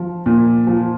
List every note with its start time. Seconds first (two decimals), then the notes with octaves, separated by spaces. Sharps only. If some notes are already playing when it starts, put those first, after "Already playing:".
Already playing: F3
0.26 A#2
0.67 F3